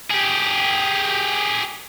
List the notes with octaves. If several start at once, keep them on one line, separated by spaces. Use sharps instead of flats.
G4 G#4